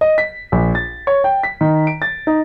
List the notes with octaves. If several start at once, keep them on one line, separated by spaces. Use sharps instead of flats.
D#5
B6
A#1
A6
C#5
G5
B6
D#3
D7
A6
D#4